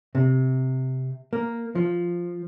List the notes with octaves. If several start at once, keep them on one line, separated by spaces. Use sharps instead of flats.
C3
A#3
F3